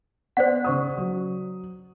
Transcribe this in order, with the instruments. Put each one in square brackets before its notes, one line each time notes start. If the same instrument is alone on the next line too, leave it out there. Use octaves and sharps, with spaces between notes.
[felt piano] B3 [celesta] C5 D5 F#5
[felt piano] C#3 C#6 D#6
F#3